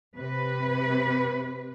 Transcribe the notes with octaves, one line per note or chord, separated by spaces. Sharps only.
C3 B4